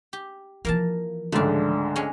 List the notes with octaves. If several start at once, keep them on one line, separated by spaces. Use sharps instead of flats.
G4
E3 F3 A#3 A#4 A5
C#2 G#2 D3 A3 D4
G#3 C#4